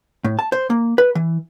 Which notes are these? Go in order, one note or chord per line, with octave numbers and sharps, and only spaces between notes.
A2
A5
C5
A#3
B4
E3